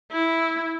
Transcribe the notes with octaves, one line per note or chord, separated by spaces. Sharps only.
E4